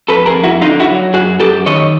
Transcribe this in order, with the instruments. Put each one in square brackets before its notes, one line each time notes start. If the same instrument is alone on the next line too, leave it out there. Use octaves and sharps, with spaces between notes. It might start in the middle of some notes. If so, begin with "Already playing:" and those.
[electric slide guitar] F2 A4 B4
G#4 A#4
F2
E4 F#4
D3 D#4 F4
E4 F#4
F#3
F#2 F#4 G#4
F#2 G4 A4
D#3 C#5 D#5